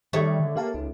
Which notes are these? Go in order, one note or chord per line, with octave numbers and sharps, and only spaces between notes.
D#3 G3 A3 G4 C#5 D#5
D3
A#3 G4 F5 A5
C#2 D#4